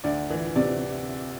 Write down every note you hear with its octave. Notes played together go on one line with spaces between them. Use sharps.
D2 D5
E3
C3 D5